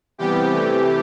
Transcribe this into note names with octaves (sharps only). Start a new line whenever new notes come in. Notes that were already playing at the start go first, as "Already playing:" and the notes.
C3 E3 G3 B3 G4
C3 E3 A3